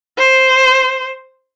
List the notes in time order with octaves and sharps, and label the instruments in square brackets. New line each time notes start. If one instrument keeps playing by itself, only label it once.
[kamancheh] C5